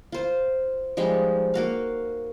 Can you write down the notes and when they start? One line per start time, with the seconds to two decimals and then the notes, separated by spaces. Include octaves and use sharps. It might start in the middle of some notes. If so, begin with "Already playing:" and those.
0.12 F4 C5
0.97 F3 G3 G#3 D#4
1.54 A#3 F#4 F5